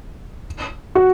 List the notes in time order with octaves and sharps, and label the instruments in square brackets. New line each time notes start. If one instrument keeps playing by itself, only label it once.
[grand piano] F#4